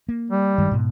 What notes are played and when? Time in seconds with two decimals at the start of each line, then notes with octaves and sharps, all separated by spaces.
0.09 A#3
0.30 G3
0.58 G2 D#3 G#3
0.71 G#2 B2